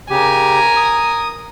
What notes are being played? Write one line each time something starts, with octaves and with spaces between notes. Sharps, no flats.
C#3 G4 A#4 G#5
D#6